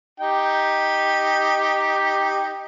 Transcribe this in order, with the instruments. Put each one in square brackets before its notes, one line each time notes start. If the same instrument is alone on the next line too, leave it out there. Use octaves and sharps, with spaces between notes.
[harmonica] D#4 G4 G5